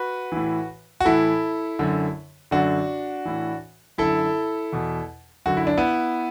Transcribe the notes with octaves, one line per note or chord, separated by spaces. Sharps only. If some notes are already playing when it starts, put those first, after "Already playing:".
Already playing: F#4 B4
A2 E3
F#4
A2 E3 E4 A4
F#2 D3
F#2 D3 D4 F#4
A2 E3
F#2 D3 E4 A4
E2 B2
F#2 D3 F#4
E4
D4
B3 E4